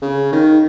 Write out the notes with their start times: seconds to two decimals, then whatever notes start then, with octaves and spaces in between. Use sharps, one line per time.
0.02 C#3
0.33 D#3